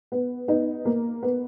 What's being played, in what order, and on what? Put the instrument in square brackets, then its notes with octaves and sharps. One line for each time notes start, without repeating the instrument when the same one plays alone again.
[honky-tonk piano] B3
B3 D#4
A#3
B3